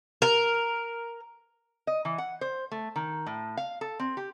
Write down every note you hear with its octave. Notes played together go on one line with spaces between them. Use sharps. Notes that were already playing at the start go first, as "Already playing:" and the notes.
A#4
D#5
E3
F#5
C5
A3
D#3
A2
F5
A4
C4
G4